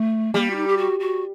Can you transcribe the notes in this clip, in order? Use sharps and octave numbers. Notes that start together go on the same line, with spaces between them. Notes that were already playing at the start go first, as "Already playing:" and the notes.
Already playing: A3
G3 A#3
F#4
D#4
G4
F#4
F#4